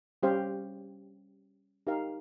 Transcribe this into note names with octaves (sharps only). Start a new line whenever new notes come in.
G3 C#4 G4 C5 F5
D#4 G4 A#4 F5